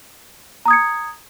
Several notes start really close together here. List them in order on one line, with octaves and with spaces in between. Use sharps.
A#5 D#6 G#6 C#7